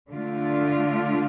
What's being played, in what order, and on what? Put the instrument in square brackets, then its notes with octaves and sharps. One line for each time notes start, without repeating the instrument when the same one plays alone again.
[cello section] D3 A3 D4 F4